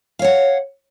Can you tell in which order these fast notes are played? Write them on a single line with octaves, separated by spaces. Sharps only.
F5 C#5 F#5